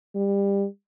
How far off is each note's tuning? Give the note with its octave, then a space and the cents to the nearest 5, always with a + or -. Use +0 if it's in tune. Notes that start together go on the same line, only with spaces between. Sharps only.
G3 +25